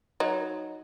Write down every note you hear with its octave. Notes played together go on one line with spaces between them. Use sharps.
F#3 D#4